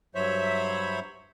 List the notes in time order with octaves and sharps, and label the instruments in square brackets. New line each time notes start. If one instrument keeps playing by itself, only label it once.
[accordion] G2 F#3 C5 C#5 E5 B5